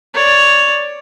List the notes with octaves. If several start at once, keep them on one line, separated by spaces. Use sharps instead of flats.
C#5 D5